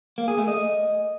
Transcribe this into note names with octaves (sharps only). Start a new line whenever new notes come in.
A#3
G#4
A3
D#5